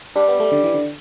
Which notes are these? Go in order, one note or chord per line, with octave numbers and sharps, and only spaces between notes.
G3 D4
B3
A3
D3
E3
D3